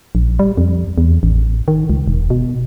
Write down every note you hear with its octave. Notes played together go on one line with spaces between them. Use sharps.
A#1
G3
F2
E2
A1
D#3
C#2
E1
B2